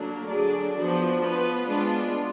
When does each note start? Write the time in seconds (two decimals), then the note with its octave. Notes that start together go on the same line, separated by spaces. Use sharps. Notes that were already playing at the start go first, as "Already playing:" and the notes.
Already playing: D3 F#3 A#3 D4 F#4
0.29 D3 F#3 D4 G#4 D5
0.75 F3 B3 D4 F#4
1.22 B3 F4 B4
1.67 G#3 B3 D4 F4